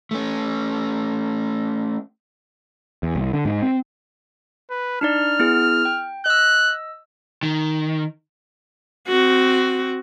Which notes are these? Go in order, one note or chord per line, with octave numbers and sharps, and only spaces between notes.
A3 C#4
E2
C2
D3
G#2
C4
B4
D4 D#4 D5 F6
B3 E4 G#4
G5
D#5 E6 F#6
D#3
C4 F#4